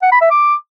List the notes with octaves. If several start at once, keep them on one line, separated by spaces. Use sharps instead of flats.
F#5
B5
E5
D6